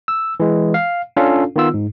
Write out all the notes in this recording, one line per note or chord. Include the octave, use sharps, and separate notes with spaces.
E6
E3 G#3
F5
C#4 D4 F4 A4 F5
D#3 B3 F4 E6
G#2